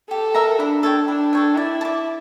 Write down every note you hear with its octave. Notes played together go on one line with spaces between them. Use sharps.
G4 A4
A#4 E5 A#5
D4 E4
A4 C#5 G5
D4 E4
A4 C#5 G5
E4 D5
A5
D6